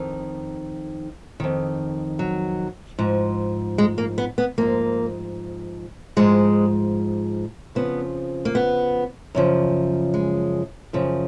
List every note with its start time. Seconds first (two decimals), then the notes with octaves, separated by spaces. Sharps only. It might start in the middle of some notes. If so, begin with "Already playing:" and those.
Already playing: F2 D#3
1.40 F2 D#3
2.19 F#3
2.99 G#2 F3
3.78 G#3
3.98 A#3
4.18 B3
4.38 B3
4.58 G#2 F3 A#3
6.16 G#2 F3 G#3
7.75 F2 C#3 F3 B3
8.45 A#3
8.55 B3
9.35 F#2 C#3 F3
10.14 G#3
10.93 F#2 C#3 F3